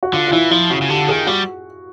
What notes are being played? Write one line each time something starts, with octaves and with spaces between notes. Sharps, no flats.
F#4
D3 F4
F4
E3 E4
F3 E4
C#3 F#4
C#3
D3 G4
D#3 G#4
G3 F#4